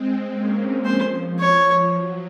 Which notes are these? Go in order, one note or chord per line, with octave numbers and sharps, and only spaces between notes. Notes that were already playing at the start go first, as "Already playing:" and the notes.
Already playing: G#3 C4
A#3 C#4
F3 C5
C#5
F#3